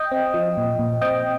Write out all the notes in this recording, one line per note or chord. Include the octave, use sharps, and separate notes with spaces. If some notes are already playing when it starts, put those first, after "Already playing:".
Already playing: D#5 G5
C4
F3
A#2
A#2
C4 D#5 G5